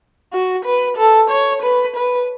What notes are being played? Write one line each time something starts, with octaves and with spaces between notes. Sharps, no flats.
F#4
B4
A4
C#5
B4
B4